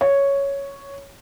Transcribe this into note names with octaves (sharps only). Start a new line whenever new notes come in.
C#5